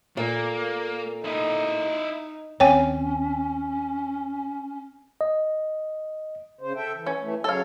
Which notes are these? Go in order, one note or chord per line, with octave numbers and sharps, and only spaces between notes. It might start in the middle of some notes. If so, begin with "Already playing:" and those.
A#2 A#3 A4 A#5
D#4 E4 D#5
D#2 C4 C#4 C#5 G5 G#5
D#5
C#3 C5
A4 E5 G5
E3
C#4
E3 A3
C#3 F#3 A4 C#5 F5